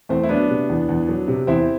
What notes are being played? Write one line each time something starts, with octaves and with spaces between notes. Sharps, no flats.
E2 A3 C4
E4
F#3 B3 D4
C3
E2
E2
F#3
C3
E2 C4 E4